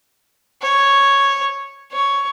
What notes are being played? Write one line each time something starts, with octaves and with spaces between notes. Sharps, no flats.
C#5
C#5